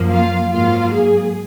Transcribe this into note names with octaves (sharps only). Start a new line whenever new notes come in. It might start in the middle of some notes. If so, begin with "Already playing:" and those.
Already playing: F#2 F3 A#3
F4 F5
G#2 F#3 A#3 F4 F5
G#4